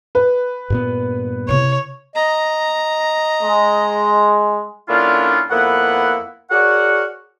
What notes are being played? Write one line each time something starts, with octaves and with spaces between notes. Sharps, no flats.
B4
G2 A#2 B3
C3 E4 C#5
D#5 A#5
G#3
D3 A#3 C#4 D4 E4 F4
F2 A#3 B3 E4 F#5
F#4 G#4 A#4 C#5 D5 F#5